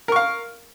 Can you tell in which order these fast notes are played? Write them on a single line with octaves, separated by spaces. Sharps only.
A#4 C#6 F5